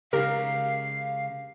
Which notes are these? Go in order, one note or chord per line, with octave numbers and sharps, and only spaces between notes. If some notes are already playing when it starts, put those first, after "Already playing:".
C#3 G#3 G4 A#4 F5